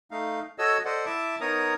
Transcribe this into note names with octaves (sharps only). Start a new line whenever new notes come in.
A3 D#4 F5
F#4 A4 C#5 D#5 E6
A4 C5 D5 D#5 F#5
E4 E5 A5 D6
B3 D#4 A#4 C#5 A#5 D#6